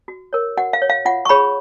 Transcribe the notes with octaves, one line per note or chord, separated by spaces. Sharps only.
F#4
A#4 C#5
F#4 F#5
F5
C#5
F5
F4 F#5
C#6
G#4 C#5 B5